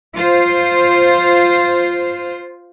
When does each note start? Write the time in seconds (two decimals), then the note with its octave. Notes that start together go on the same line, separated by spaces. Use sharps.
0.15 F4 C5